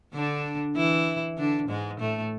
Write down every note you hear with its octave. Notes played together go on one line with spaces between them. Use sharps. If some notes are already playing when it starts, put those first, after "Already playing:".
D3 D4
E3 E4
D3 D4
G#2 G#3
A2 A3